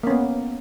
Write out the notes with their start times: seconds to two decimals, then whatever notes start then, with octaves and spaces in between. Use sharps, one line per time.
0.04 A#3
0.07 C#4
0.10 B3